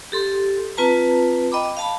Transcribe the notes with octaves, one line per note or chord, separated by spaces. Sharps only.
G4 A4 C6
C4 F4 B4 A5 A#5
D#5 G5 B5 D6
F5 A5 B5